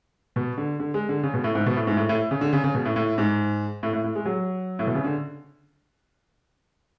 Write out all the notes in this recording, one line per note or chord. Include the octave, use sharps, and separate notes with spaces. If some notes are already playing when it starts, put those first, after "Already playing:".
B2
D3
D3
G#3
D3
C#3
B2
A2
G#2
B2
A2
G#2
A2
A2
C#3
D3
C#3
C#3
B2
A2
A2
G#2
A2
A2
A2
G#3
F#3
A2
B2
C#3
D3